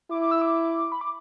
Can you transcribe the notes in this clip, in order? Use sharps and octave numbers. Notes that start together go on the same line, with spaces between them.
E4 D6
D6
E6
D6
B5
D6